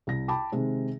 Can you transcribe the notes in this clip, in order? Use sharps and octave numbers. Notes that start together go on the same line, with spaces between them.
C2 A#6
G5 A5 B5 D6
C3 D#3 G#3